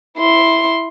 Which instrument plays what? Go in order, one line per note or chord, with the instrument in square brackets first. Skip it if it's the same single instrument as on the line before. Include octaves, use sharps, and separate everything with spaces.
[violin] E4 C6